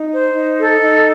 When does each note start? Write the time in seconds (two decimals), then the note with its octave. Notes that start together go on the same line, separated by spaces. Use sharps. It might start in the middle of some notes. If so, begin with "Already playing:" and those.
Already playing: D#4
0.12 C5
0.34 D#4
0.58 A4
0.81 D#4